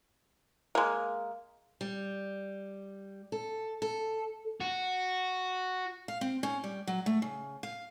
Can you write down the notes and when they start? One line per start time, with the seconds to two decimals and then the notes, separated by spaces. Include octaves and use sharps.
0.75 G#3 A#3
1.81 G3
3.32 A4
3.82 A4
4.60 F#4
6.08 F5
6.21 C4
6.43 C#4
6.64 G3
6.87 F#3
7.06 A3
7.22 C#3
7.63 F5